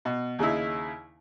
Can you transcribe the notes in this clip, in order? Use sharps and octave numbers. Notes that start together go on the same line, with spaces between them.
B2
D#2 C#3 D#4 E4